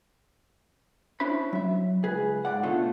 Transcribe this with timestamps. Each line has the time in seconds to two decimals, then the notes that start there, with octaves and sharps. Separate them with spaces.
1.20 C#4 D4 E4 C5 B5
1.53 F#3 E5
2.03 C#2 G#4 B4
2.45 G#2 D5 F#5
2.63 B2 D3 A3 C#4 F4